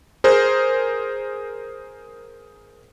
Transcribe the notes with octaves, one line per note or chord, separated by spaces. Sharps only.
G#4 A#4 C5